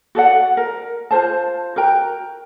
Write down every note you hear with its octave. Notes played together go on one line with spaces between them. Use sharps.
F#4 A4 D5 F#5
A#4
F4 B4 C5 A5
F#4 A#4 G5 A#5